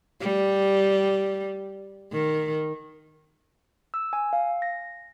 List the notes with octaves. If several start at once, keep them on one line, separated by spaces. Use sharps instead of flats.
G3
D#3
E6
G#5
F5
A#6